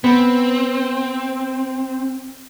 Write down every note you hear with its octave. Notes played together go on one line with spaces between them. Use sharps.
B3 C4